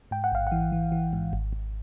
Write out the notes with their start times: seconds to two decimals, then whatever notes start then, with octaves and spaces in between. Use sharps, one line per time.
0.11 G#2 G5
0.24 F#5
0.32 A1 F5
0.47 E3 F#5
0.72 E3
0.92 E3
1.13 G#2
1.33 G#1
1.53 G#1